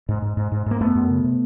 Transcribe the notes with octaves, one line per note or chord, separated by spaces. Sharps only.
G#2
G#2
G#2
G#2
G#2 A#3
F#2 A3 B3
F#2
C#3
C3